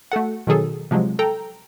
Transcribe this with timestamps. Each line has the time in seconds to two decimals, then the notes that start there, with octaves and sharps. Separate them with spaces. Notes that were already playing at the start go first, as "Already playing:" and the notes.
0.12 A3 F#4 A4 F#5
0.47 B2 D#3 F#3 G#4 A4
0.91 C3 F3 F#3 G#3
1.19 A4 G5 A#5